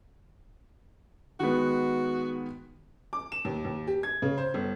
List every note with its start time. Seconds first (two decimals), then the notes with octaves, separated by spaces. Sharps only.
1.40 D#3 G#3 B3 F#4
3.13 D6
3.32 E7
3.45 D#2
3.65 D#2
3.87 G4
4.03 G#6
4.22 C#3
4.38 C5
4.54 G1